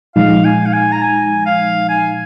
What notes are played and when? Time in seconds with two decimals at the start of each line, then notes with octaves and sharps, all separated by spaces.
0.16 A#2 F3 G#3 D#4 F5
0.45 G#5
0.66 F5
0.73 G#5
0.92 A#5
1.02 G#5
1.46 F5
1.89 G#5